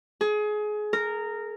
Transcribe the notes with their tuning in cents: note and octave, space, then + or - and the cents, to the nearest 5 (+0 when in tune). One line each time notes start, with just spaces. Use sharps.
G#4 +25
A#4 -15